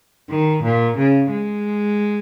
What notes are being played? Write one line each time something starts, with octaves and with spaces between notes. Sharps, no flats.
D#3
A#2
C#3
G#3